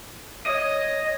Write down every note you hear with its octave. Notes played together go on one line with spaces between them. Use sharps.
C#5 D#5